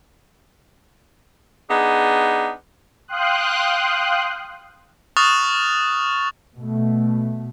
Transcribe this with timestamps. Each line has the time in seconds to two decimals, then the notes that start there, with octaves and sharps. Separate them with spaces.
1.69 B3 D4 D#4 G#4
3.08 F5 G5 C6 D#6 F#6
5.17 C#6 D#6 F6 F#6 A6 F7
6.57 B2 A3